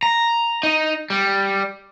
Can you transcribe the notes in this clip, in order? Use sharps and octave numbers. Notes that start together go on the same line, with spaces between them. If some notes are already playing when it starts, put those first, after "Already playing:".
A#5
D#4
G3